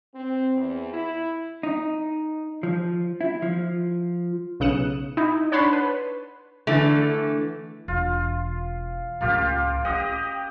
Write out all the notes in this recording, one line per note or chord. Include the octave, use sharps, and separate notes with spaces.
C4
E2
E4
D#4
F3
E4
F3
B1 C#3 D#6 F#6 C#7 E7
D#4 E4
D4 C#5 F#5 A5 B5 C6
B4
D3 E3 A3
E1 F4
C#2 A2 A#3 F4 G4
C#4 G4 D#5 F#5